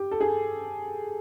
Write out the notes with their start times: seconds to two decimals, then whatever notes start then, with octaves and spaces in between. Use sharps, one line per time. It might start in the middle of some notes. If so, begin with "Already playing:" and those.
Already playing: G4
0.11 A4
0.21 G#4